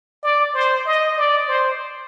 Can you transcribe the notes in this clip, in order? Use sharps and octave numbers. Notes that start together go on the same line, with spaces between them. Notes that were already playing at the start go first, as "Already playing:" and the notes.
D5
C5
D#5
D5
C5